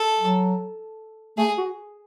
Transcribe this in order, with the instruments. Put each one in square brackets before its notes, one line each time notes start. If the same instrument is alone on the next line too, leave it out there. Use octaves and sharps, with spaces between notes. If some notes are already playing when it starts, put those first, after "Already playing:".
Already playing: [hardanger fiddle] A4
[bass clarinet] F#3
[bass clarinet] A3 [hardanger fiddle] G#4
[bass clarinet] F#4